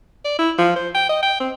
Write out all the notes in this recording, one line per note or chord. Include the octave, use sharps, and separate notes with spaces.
D5
E4
F3
C5
G5
D#5
G5
C4